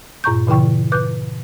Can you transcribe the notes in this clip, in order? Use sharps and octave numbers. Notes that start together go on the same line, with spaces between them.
G2 A#2 A#5 C#6 G6
A#2 C#3 E3 E4 G5 C#6
B4 D6 F#6 G6